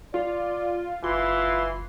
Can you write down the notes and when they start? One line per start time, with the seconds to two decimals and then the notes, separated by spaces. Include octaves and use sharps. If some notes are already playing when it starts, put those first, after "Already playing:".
0.14 F4 D5
1.04 F#1 E3 F4 C6